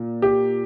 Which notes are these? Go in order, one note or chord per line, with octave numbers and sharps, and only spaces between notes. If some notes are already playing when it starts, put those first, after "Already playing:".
Already playing: A#2
G4